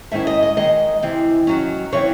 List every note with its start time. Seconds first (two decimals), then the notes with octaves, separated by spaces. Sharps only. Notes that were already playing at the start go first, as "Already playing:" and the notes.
0.11 G#2 D#3 G#3 C#4 E4 E5
0.27 D#5
0.42 D#5
0.57 D#2 D#3 G#3 D#5
1.02 C3 E3 C4
1.47 D#3 F#3 C#4
1.92 C#3 E3 C4 C#5